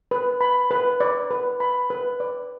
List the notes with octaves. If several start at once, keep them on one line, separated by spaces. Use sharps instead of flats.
B4
B5
B4
D5
B4
B5
B4
D5